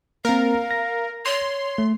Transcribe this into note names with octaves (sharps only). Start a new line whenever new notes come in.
A#3 C4 A#4 F5
A#6
C#5 C6
A3